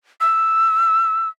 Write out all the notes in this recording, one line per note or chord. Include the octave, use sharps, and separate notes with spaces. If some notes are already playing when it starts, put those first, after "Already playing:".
E6